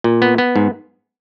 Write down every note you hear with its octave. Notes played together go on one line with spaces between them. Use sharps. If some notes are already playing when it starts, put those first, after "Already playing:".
A#2
B3
B3
G#2